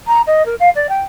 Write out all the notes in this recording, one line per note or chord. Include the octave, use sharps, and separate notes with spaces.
A#5
D#5
A#4
F5
D5
G5